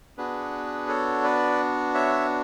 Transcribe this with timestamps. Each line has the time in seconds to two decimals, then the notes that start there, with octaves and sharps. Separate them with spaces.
0.18 B3 D4 F#4 G#4 B4
0.88 A4 C#5
1.24 B4 D5
1.95 C#5 E5